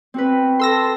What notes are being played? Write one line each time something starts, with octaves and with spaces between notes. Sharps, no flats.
C4 F#4 B4
A4 C6 E6 A#6